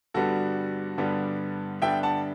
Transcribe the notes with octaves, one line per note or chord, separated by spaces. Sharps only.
G2 D3 G3 B3 D4 F#4 A4
G2 D3 G3 B3 D4
G2 D3 G3 B3 D4 E5 G5
F#5 A5